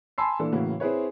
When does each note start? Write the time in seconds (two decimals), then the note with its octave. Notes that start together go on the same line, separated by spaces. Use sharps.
0.18 G#5 A5 B5 C6 E6 C7
0.39 A#2 E3 D4 A4
0.52 A2 C#3 E3 A#3 F#4
0.80 C4 E4 G#4 B4 C#5